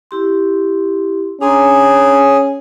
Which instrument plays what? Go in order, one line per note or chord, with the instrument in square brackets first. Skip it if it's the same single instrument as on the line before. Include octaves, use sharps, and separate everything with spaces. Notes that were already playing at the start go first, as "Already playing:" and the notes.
[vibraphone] E4 G4 C6
[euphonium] C#4 [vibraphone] D4 A#5 C6 [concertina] G#4